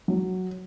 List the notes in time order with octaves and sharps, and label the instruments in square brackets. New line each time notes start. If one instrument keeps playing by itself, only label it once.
[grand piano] F#3